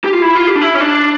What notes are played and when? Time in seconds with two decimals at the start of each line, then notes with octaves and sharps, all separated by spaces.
0.04 G4
0.13 F4
0.22 E4
0.35 F4
0.47 G4
0.55 D4
0.61 E4
0.75 C#4
0.81 D4